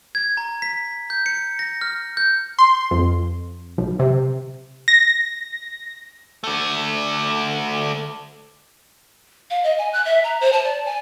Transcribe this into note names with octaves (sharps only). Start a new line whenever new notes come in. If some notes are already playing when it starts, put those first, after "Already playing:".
G#6
A#5
B6
G6
C#7
A#6
F6
G6
C6
F2
B1
C3
A#6
D3 A3
F5
D#5
G#5
F#6
E5
A#5
C5
A5
D5
G#5